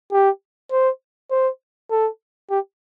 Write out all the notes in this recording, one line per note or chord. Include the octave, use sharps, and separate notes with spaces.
G4
C5
C5
A4
G4